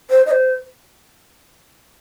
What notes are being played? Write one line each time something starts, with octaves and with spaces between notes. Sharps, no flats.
C5
D#5
C5